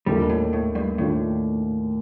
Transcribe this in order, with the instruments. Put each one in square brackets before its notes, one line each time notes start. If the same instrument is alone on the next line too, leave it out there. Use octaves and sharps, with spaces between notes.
[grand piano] D#2 D#3 A3 D4 F4 [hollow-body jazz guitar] G3
[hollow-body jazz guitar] A2
A2
G2
[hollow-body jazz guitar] A2 [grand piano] D#3 A3 D4 F4